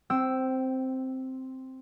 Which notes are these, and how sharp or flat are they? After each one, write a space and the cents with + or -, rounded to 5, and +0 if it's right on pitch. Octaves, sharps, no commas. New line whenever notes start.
C4 +0 G5 -20 E6 +0